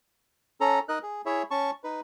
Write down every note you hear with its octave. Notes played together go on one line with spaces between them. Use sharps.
C#4 A4 A#5
D#4 A#4 D#5 F#6
G#4
E4 G#4 C#5 E5
C#4 A5 C#6
D#4 B4